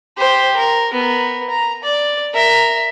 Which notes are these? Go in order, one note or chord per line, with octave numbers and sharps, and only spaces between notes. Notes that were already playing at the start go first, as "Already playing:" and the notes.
G4 C5
A#4
B3 A#4
A#5
D5
A#4 E5